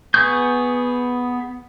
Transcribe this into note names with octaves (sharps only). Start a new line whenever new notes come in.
B3 G#4 C#6 D#6 G6